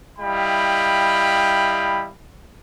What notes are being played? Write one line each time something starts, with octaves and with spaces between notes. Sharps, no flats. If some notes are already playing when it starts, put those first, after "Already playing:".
G3 E4 D#5 F5 G5 B5